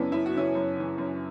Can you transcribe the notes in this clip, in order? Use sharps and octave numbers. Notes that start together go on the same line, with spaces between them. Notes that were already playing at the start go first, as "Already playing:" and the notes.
Already playing: F#2 C#3 E3 B3 C#4 D4 E4
F#2 E4
F#4
C#3 E3 C#4 E4
F#2
C#3 E3
F#2